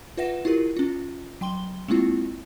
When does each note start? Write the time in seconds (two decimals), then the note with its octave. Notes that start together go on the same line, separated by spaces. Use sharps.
0.17 F4 B4 E5 F#5 A#6 E7
0.45 E4 F4 G4 A#4
0.77 C#4 F4
1.41 F#3 G5 C6 G7
1.88 G#3 A#3 C4 E4 F4